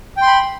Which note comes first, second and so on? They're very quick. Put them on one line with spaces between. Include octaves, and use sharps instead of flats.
G5 C6 B5